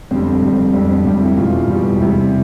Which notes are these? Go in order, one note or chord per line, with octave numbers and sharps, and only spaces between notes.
F2 D3 G3 C4
F2 D3 G3
F2 D3 G3 D4
C4
F2 D3 G3 C4
E4
E2 B2 G3 F4
E2 B2 G3
E2 C3 G3 E4